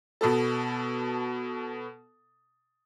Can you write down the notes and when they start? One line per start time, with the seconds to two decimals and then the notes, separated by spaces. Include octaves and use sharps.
0.21 B2 B3 A4